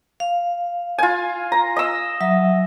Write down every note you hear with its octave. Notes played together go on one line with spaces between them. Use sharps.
F5
F4 G#5
A#5
D#5 E6
F#3 E5